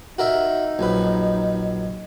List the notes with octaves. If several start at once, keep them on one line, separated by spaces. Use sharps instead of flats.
D#4 F#4 A#4 E5
A#1 F#2 B4